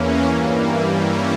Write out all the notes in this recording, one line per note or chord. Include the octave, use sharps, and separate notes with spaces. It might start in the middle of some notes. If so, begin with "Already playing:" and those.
Already playing: E2 E3 A#3 C#4
G2 E3 G3 A#3
E3 G3 A#3 C#4 E4